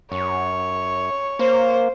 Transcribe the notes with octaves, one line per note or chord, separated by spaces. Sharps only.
F#2 C#5
A#3 C5